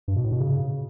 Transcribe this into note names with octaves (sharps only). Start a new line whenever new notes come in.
G2
B2
A2
B2
C#3